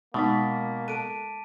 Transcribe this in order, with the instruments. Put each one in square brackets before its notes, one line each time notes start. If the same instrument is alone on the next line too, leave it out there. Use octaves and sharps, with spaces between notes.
[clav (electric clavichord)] B2 [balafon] G#3 D#4 [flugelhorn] A#3 [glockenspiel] D6 A6 B6
[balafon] A4 [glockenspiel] A5 D7 D#7